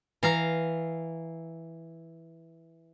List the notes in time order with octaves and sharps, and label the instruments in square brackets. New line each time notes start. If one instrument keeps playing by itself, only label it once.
[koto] E3 F5 A#5